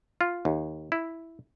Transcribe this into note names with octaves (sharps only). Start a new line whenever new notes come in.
F4
D#2
E4